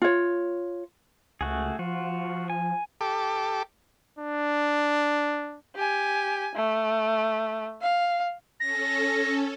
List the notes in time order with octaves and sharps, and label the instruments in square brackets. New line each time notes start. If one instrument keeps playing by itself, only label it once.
[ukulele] F4 C#5
[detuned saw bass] C#2 [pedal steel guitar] A3 F#4 G#4
[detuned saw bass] F3 [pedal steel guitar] F4 F#4
[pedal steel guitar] G#5
[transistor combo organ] G4 A4 D6
[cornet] D4
[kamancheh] G4 G#5
A3
F5
[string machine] C#4 A4 [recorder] A#6